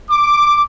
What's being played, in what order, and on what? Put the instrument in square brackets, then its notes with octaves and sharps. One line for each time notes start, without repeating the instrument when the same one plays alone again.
[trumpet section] D6